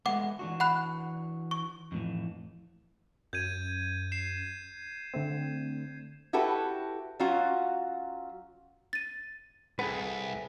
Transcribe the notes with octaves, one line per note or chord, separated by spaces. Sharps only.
G#3 A3 B3 F#5 D6
E3 D4 F#4
F#5 B5 F#6
C#6
F2 A2 E3
F#2 G6 G#6 D#7
C7 E7
D3 A3 C4
E4 F#4 G4 A4 B4
F#3 C#4 F4 F#4
A6 D#7
C2 G#4 A4 B4 F#5